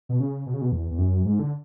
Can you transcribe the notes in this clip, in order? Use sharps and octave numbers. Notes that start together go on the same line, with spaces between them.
B2
C#3
B2
C#3
B2
E2
E2
F#2
G#2
D3